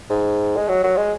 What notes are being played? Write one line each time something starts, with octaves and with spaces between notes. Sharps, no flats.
G#2
G#3
F#3
F#3
G#3